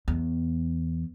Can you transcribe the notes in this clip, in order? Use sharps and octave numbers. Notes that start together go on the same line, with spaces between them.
E2